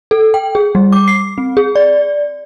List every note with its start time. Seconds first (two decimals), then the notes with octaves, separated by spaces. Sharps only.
0.11 A4
0.34 G5
0.55 G#4
0.75 G3
0.92 D6
1.08 C7
1.38 C4
1.57 G#4
1.76 D5